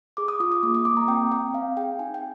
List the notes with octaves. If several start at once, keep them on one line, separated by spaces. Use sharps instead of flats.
G#4 D6
D#6
F4 D#6
D#6
A#3 D6
D#6
A#3 D6
A#5
C4 G5
C4 G5
C4 F5
G#4 G5
D#4 G#5
G5